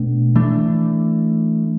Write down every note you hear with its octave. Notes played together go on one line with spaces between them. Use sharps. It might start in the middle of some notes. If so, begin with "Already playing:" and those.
Already playing: B2 A3 D4
E3 A3 D4